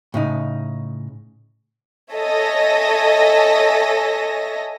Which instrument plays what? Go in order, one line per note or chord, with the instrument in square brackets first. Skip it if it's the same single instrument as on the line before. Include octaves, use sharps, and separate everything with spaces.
[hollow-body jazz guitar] A2 C#3 D#4
[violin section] A4 C#5 D#5 E5 G#5 A#6